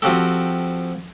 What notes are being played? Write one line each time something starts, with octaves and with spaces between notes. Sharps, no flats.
F3 C4 F#4 G4 A4